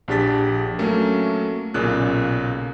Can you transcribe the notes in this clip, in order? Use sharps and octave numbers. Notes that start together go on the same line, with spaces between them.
A#1 D4 G4 G#4 A6 B6
F#3 A3 A#3 C#4
B1 A#2 C#3 F#6